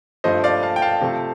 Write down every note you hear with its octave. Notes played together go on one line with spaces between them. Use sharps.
G2 F3 A3 C5 D#5
D5 F5
F5 A5
G5
F5 A5
C3 F3 A3